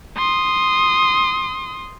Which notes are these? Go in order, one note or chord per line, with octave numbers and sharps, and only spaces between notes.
C6 D#6